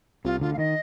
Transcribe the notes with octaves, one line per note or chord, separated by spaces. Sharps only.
C2 C3 F4
D2 D3 F4
F5
D#3 D#5